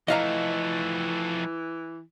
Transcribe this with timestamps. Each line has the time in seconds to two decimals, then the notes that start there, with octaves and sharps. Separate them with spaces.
0.08 F2 E3 A3 D#5 F5 A#5